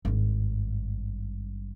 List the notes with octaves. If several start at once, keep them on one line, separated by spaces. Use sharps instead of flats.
G#1 G2